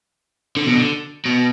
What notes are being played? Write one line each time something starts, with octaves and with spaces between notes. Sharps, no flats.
D3
B2
D3
B2